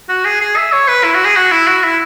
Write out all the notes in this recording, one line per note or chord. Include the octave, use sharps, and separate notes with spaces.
F#4
G#4
G#4
E5
C#5
B4
E4
F#4
G#4
F#4
E4
F#4
E4